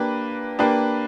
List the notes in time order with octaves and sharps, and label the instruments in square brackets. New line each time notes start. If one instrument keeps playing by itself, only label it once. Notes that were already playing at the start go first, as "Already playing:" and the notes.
Already playing: [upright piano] A#3 D4 G4 B4
A#3 D4 G4 B4